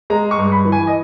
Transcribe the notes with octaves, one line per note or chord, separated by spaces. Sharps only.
G#3 A#5
C#6
G2
B5
E3
G#5
D#5